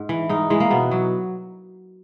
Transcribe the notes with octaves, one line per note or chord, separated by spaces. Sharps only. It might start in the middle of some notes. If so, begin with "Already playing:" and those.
Already playing: G#2
E3
G#2 D#4
E3 G#3
A#3
B2 B3
F#3